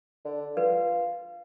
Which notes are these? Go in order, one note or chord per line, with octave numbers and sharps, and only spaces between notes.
D3
F4 B4